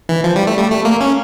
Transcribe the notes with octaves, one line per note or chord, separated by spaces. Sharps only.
E3
F3
G3
A3
G3
A3
A#3
C#4